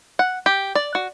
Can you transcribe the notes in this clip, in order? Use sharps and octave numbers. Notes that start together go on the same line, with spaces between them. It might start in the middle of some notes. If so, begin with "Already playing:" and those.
F#5
G4
D5
F#4